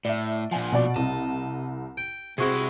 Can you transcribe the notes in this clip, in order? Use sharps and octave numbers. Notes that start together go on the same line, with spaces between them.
A2 D5 E5
A#2 F3 F#5 G#5
B2 D5
C2 D#5 A5
G5
C3 G#3 C4 E4 F#4 G#4